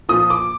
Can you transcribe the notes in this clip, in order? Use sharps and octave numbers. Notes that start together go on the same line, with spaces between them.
A#2 F3 D#6
D6